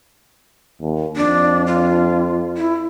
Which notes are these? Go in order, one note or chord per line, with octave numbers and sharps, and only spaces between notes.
D#2
F2 D4
F4
E4